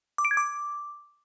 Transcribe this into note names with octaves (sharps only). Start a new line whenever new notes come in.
D6
D7
G#6
D6